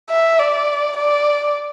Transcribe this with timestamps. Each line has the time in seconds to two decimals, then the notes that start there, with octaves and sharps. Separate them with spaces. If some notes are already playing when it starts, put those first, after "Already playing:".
0.10 E5
0.40 D5
0.97 D5